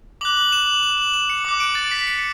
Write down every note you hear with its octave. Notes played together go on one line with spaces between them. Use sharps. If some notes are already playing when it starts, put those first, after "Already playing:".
D6 F#6 F#7
F#7
E7
F#7
E7
F#7
E7
C#7
D6 F#6
D7
A6
B6
C#7